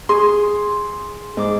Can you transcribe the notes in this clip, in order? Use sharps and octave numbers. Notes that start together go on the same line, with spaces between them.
G#4 C6
G#2 D6